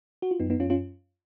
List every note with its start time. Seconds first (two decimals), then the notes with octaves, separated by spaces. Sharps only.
0.22 F#4
0.31 F4
0.40 F#2 B3 D#4
0.50 B3 D#4
0.60 F#2 C#4 F4
0.70 C#4 F4